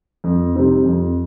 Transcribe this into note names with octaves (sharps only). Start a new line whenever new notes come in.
F2
C3 G3 C4 D#4
F2